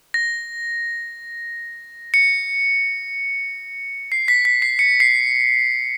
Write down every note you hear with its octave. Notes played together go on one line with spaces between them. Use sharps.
A#6
C#7
C7
B6
B6
C7
C#7
C7